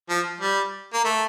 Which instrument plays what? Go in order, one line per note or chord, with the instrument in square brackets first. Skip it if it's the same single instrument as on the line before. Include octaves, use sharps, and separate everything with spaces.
[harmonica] F3
G3
A#3
A3